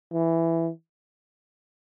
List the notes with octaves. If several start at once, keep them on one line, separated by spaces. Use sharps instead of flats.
E3